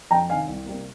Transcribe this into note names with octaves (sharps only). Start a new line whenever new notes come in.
F2 G5 A#5
C3 D#3 F5 G#5
C2
C3 G3 A#3